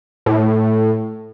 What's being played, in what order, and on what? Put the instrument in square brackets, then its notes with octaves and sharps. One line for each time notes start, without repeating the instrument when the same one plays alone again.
[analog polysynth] A2